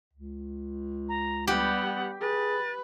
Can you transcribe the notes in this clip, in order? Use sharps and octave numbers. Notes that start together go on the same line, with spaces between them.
C#2
A#5
G3 B3 G4 F#5
G#4 B4 A6